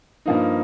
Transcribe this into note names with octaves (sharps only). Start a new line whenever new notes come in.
G2 F3 A#3 D#4